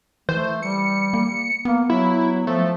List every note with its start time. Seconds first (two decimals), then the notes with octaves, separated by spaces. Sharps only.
0.29 E3 A3 C5
0.62 G3 C#7
1.14 A#3
1.65 A#3 B3
1.90 F#3 E4
2.47 F3 A3